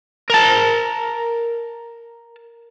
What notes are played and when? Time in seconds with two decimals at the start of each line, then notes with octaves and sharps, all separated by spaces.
0.30 A#4 A5